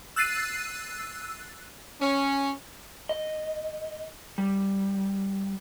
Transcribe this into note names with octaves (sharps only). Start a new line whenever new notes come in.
E6 F#6 A6 C7 D#7
C#4
D#5
G3